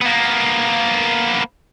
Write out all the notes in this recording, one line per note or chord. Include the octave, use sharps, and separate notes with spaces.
A#3 B3